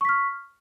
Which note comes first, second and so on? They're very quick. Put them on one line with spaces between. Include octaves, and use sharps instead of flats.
C#6 B6 F6